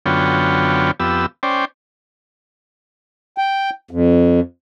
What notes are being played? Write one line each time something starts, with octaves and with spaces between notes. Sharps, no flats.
F#2 D3 B3 F4 C#5 G5
F2 B3 G4 E6
C#4 C5 D5 G5
G5
F2